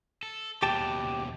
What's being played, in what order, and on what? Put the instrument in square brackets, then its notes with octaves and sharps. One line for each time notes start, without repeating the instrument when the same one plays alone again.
[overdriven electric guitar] A4
[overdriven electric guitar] D#2 B2 [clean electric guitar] G4 G5 A5